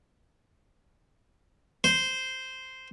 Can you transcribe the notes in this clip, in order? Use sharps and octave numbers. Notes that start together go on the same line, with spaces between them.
C5